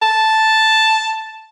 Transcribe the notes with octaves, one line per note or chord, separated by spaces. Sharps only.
A5